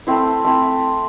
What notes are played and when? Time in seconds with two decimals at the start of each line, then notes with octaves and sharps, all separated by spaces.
0.07 A3 C4 E4
0.45 A3 C4 E4